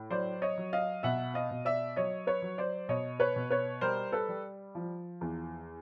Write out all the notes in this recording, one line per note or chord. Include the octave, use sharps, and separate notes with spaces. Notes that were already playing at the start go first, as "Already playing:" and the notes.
Already playing: A2
F#3 C5 D5
C#5 D#5
F#3
D#5 F5
B2 E5 F#5
D#5 F5
B2
D5 E5
F#3 C#5 D#5
B4 C#5
F#3
C5 D5
B2 C#5 D#5
B4 C#5
B2
B4 C#5
G3 A#4 C5
A4 B4
G3
F3
E2